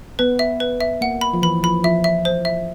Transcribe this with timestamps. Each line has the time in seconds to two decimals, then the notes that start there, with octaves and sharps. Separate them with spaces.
0.19 B3 B4
0.39 E5
0.60 B4
0.81 E5
1.01 A#3 F#5
1.21 B5
1.33 F3
1.42 E3 B5
1.63 F3 B5
1.84 F3 E5
2.04 E5
2.25 C5
2.45 E5